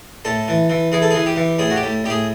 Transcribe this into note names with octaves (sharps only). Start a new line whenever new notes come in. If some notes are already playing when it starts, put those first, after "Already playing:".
A2 A4
E3
E3
E3 G#4
A4
E3 G#4
G4
E3
A2 G#4
F#4
G4
A2
A2 G4
G#4